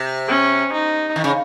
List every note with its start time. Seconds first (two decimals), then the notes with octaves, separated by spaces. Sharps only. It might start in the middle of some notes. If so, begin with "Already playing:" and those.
Already playing: C3
0.28 C#4
0.72 D#4
1.16 D#3
1.24 C#3